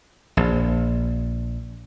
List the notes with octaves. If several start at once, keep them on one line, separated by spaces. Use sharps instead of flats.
A#1